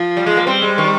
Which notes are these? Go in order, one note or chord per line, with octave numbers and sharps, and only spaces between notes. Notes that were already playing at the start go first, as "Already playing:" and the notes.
Already playing: F3
G3
G#3
A#3
G3 C4
G#3
D#3